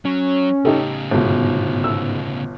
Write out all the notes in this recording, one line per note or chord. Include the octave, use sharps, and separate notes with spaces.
F#3 C#4
A2 C#3 D#4 G4 A4
G1 G#2 B2
E6